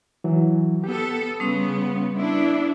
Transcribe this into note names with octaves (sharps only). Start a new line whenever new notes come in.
E3 F#3
B3 G4 A4
C#3 G3 B3 C#4 C6 D#6
B3 D4 E4